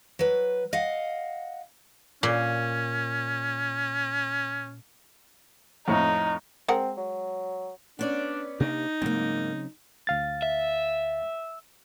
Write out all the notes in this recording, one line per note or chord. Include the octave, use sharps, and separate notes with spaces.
F#3 B4
D#5 F5 F#5
A#2 C#4
F2 A2 D#4
G#3 C4 A#4 F#5
F#3
B3 C#4 D4 D5
C3 A#3 D4 D#4
G#2 C#3 F#3 A#3 C4
D2 F5 A6
E5